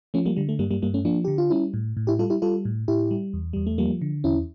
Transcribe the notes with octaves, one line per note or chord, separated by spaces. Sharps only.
F3 A3 C#4
G3 A#3
D3 G3
A3
G2 G3 A#3
G3 A#3
G2 G3 A#3
A3 C#4
F3 A#3 D4
D3 G4
F4
G3 C#4 E4
A2
A2
E4 G4
G3 F4 A4
E4 G4
G3 F4 A4
A2
A2 E4 G4
G3
E2
E2 G3
A3
F3 G3 A#3
D3
E2 C#4 E4